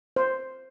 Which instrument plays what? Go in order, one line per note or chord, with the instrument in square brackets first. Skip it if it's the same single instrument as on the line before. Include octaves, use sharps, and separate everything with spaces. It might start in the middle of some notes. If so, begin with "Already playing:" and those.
[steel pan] C5